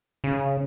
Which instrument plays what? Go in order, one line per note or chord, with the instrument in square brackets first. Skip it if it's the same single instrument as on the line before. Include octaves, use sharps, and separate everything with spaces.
[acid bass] C#3